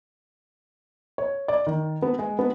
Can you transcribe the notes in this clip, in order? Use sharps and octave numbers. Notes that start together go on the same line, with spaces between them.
C#5
D5
D#3
B3
G#3
B3